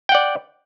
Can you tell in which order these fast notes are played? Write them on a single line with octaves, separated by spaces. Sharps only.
G5 F#5 D5